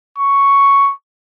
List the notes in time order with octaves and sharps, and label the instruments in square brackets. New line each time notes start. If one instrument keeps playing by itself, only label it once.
[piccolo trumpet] C#6